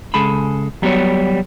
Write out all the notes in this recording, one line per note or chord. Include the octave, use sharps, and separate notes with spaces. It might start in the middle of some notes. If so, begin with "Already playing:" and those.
C#3 G#3 G#4 A4 B5
F#3 G3 B3 F#4 C#5